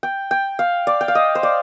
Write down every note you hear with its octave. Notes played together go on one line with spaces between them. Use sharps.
G5
G5
F5
D5
G5
F5
D#5
C5
D5